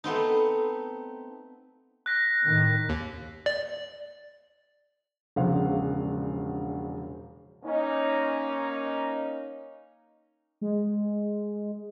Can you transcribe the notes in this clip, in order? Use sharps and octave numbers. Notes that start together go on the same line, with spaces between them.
A3 B3 C4 D#4
F#6 A#6 B6
A2 D#3
D#2
D5
E1 A#1 C#3 C5 F5 F#5
A#3 C#4 D#4
G#3